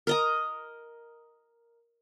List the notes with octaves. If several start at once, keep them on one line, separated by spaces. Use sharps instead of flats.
A#4 D#5 A#5